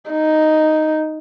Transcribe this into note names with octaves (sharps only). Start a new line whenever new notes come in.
D#4